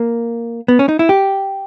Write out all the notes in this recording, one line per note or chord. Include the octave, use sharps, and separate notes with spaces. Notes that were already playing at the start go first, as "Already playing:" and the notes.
Already playing: A#3
B3
C#4
D#4
E4
G4